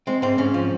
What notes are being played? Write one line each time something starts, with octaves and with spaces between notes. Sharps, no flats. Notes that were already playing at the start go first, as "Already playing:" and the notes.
G#3 C4
G#2 C4
G#2 C#4
F3